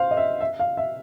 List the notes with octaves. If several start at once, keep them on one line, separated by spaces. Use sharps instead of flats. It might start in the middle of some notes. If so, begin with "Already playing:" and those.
Already playing: C5 F5
D#5
E5
E5
F5
E5